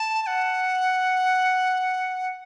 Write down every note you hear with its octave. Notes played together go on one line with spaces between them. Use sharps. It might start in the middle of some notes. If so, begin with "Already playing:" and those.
Already playing: A5
A5
F#5